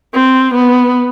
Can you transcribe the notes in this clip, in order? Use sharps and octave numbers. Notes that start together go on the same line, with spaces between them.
C4
B3